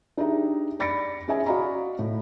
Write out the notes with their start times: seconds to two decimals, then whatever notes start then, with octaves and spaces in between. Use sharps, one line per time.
0.17 D4 D#4 G4 G#4 E5 A#5
0.80 D5 B5 A6 A#6 C#7 D7
1.28 C#4 G#4 D#5 E5 G#5
1.46 F#4 D5 D#5 F5 A#5 B5
1.99 A2